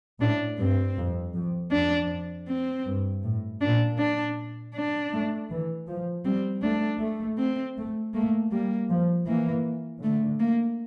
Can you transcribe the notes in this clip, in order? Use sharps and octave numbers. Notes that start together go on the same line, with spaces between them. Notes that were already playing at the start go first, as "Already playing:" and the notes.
A2 D4
G2 C4
F2
F2
F2 D4
C4
G2
A2
A#2 D4
D4
D4
A3
E3
F3
G3 C4
A3 D4
A3
C4
A3
A3 A#3
G3 A#3
F3
E3 A#3
D3 A3
A#3